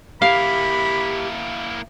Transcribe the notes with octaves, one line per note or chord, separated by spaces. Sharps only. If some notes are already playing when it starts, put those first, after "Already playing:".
A#3 E4 G4 F5 B5